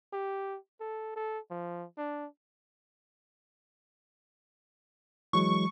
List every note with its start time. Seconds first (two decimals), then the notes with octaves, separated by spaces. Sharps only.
0.13 G4
0.80 A4
1.16 A4
1.51 F3
1.98 D4
5.33 E3 F#3 G#3 C#6